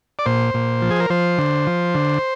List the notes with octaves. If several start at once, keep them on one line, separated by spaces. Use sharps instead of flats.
D5
A#2 C5
A#2
F3
G#4
A#4
F3 C5
D3
F3
D3